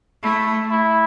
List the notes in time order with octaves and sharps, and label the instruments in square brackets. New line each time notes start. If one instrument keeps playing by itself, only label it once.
[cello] A3 [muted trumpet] E4
[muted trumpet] E4